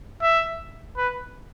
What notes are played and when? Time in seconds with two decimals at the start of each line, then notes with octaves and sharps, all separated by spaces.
0.22 E5
0.97 B4